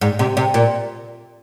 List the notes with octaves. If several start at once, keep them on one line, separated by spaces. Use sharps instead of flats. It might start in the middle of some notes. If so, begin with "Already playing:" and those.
G#2
C3
C3
A#2